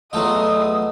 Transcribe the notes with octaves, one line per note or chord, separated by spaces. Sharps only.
E2 F#3 A3 F4 D#5 D#6